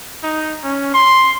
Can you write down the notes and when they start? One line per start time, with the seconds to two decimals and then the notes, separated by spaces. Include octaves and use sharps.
0.23 D#4
0.63 C#4
0.94 C6